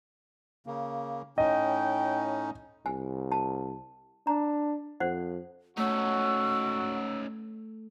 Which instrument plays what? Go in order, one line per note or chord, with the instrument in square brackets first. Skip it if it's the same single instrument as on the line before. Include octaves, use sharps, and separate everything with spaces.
[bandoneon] C#3 A#3
[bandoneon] A2 C#4 D#4 [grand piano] D#5 [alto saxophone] G5
[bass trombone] C2 [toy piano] G#5
[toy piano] A5
[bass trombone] D4 [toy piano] A#5
[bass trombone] F2 [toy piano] C5 F#5
[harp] A3 [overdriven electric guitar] C#4 D#4 [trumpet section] F#4 [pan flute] E6